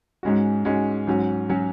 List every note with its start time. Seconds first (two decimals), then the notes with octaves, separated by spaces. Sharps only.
0.23 G#2 G#3 C#4 F#4
0.65 G#2 G#3 C#4 F#4
1.07 G#2 F#3 C#4 F#4
1.49 F#3 C#4 F#4